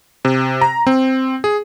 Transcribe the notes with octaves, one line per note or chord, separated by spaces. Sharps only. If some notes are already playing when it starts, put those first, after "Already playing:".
C3
A#5
C4
G#4